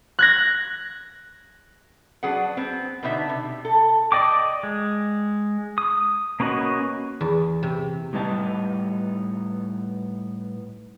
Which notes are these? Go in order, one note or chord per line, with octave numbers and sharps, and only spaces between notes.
F#6 G#6 A#6
F#3 D4 G#4 B4 F#5
B3 C4
B2 D3 B3 D#4 E5
C3
A4
D5 D#5 G5 D6
G#3
D#6
A#3 B3 C#4 F#4 D#5
E2
C3
A2 G3 B3 D#4 G5 A5